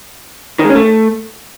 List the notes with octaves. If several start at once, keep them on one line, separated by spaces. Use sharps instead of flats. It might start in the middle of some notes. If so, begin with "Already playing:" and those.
D#3
G#3
C#4
A3